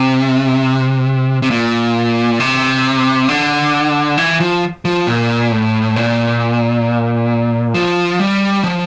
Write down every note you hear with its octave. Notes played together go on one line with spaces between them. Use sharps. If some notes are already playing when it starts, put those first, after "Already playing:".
Already playing: C3
C3
A#2
C3
D3
E3
F3
F3
A#2
A2
A#2
F3
G3
F3